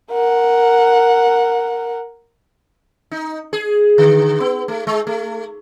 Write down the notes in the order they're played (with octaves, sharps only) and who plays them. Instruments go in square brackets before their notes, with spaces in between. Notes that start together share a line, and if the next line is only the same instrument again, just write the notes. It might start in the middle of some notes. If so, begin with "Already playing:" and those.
[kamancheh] A#4 F#5
[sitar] D#4
G#4
D3
B3
A3
G#3
A3